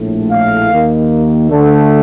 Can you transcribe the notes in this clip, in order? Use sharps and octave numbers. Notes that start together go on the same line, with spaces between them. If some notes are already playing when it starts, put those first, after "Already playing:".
Already playing: A#1 A2 A3
F5
D#2 D#3 A#3
D2 D3 A3